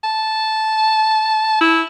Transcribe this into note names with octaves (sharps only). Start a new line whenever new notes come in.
A5
E4